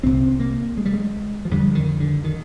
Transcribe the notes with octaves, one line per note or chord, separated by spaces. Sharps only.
C2 C3 C4
A#3
G#3
G3
G#3
F3
F2 D3 G3
D#3
D3
D#3